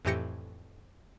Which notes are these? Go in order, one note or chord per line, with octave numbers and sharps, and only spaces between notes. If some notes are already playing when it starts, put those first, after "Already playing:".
F2 A2 E3 G4 A#6 C#7